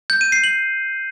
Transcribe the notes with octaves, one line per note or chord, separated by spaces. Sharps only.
G6
D#7
C7
F#7